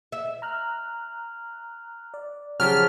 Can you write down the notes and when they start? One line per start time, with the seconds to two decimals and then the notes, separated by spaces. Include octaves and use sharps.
0.12 E5
0.42 A#5 F6 F#6
2.14 D5
2.60 C#3 F3 F#3 G4 G#4 F6 B6